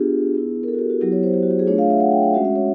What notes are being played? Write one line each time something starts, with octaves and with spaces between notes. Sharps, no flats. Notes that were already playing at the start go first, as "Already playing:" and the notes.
Already playing: B3 D4 F4 G4 G#4
B3 E4
A#4
A4
F#4
G4
F#4
F#3 B3 E4 G4
C#5
C5
G4
F#4
G4
G#4
A3 D4 F4 C#5
F5
E5
F#5
G5
F#5
G#3 C#4 F#4 E5
E5
C#5